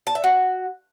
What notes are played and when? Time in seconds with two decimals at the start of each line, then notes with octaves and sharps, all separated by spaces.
0.07 A5
0.15 E5
0.24 F#4